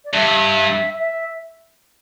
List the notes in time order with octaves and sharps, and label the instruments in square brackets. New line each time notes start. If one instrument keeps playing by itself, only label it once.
[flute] D5
[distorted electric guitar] G2 [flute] E5
[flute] E5